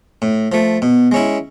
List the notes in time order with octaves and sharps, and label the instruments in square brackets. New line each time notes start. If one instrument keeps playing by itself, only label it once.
[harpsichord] A2
F3 A3
B2
G#3 C#4 E4